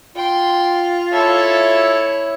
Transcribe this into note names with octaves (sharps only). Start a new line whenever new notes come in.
F4 G5 C6
E4 A4 C#5 E5